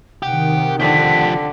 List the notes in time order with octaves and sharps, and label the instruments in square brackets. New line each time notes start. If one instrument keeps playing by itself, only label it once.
[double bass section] C3 D#3 [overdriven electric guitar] G4 [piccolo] F#5
[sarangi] D3 [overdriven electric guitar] F3 G4 [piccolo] B6